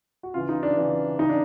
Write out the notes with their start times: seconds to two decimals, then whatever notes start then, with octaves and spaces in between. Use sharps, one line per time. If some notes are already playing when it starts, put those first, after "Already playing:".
0.23 F#4
0.34 C#3 E3 F4
0.49 D#4
0.63 D4
0.77 C#3 E3
1.19 C#3 E3 D#4
1.29 D4